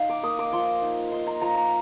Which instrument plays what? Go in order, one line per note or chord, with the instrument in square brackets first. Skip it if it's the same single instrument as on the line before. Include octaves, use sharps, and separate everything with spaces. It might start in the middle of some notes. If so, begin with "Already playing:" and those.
Already playing: [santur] D#4 F5
D6
A#3 D#6
D6
F3 C6
D#4
D#4 C6
A#5
F3 A#5
A#5